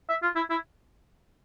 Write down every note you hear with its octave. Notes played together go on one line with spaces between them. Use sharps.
E5
F4
E4
E4